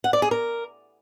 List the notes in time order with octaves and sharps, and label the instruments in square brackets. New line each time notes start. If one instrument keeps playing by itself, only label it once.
[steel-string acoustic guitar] F#5
D5
G#4
A#4